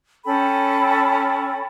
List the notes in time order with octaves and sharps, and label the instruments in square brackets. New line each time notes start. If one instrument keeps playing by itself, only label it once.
[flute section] C#4 A4 G5 B5